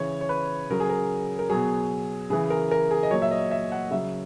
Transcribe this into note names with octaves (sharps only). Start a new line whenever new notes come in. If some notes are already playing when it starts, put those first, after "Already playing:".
Already playing: C#3 E3 C#5
C#5
B4
C#3 F#3 A#4
G#4
A#4
A#4
B2 F#3 G#4
C#3 E3 G#4
A#4
A#4
G#4
D#5
A#2 F#3 C#5
E5
D#5
E5
F#5
C#3 F#3 E5